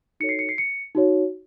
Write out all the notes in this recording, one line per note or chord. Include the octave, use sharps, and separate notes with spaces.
D#4 F#4 A4 C#5 C#7
C7
C#7
C7
C#7
D#4 F#4 C#5